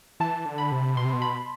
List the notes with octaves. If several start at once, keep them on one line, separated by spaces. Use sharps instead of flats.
E3 A5
D3
B5
C3
B2 C6
C3
B2
B5